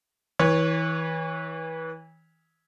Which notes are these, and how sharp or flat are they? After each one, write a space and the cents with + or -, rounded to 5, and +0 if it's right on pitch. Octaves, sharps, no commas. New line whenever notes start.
E3 -25 C#5 +0